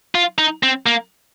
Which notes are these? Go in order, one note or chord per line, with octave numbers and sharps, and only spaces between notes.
F4
D#4
C4
A#3